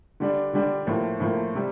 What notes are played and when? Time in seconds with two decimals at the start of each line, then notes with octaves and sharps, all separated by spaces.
0.20 D3 G3 D4
0.53 D3 G3 D4
0.87 A2 F3 A#3
1.20 A2 F3 A#3
1.55 C3 G3